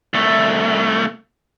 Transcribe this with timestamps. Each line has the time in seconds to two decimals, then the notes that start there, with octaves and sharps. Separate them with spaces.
0.14 C2 A3